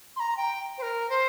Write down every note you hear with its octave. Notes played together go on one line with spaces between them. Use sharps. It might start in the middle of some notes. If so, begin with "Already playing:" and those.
C6
A#5
G5
C5
A#4
C5